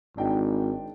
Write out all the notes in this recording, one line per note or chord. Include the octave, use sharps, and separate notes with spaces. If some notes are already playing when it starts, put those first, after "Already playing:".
G#1 D4 D#4 G5